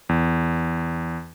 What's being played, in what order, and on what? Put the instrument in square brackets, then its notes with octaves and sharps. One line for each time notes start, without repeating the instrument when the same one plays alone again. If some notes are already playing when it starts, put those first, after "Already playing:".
[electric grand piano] E2